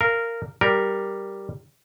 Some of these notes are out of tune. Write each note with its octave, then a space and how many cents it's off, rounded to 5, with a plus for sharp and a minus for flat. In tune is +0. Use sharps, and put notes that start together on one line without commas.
A#4 -10 F5 -15
G3 +0 A#4 +0